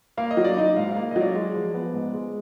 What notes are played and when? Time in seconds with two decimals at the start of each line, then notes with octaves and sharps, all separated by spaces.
0.17 A#3 F5
0.31 D#5
0.37 F#3
0.44 D5
0.57 D#4 D#5
0.76 G#2 F5
0.91 F5
0.96 A#3
1.11 D#5
1.16 F#3 D5
1.35 G#3
1.55 F3
1.74 B3
1.93 G#2
2.14 G#3